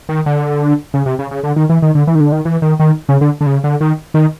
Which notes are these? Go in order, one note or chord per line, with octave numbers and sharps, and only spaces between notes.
D#3
D3
C#3
C3
C#3
C#3
D3
D#3
E3
D#3
D3
E3
D#3
D3
D#3
E3
D#3
D#3
C#3
D3
D3
C#3
D3
D#3
D#3